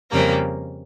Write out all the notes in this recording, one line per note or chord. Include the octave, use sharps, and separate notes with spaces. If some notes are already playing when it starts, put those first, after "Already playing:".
F2 C#3 G3 A#3 A#4